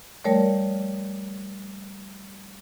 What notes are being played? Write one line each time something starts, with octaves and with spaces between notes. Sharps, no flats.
F3 G3 A3 A#4 C#5 D5